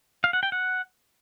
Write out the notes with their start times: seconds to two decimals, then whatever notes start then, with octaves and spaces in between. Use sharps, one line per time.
0.24 F5
0.33 F#5
0.43 G5
0.52 F#5